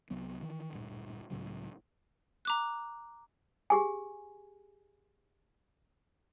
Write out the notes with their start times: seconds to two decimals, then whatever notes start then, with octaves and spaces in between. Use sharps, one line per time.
0.10 C2 F#3 B3
0.42 D#3 E3
0.72 D1 G2 A#2
1.30 C#2 A2 C#3 F#3
2.45 A#5 D6 F#6
3.70 G4 G#4 G#5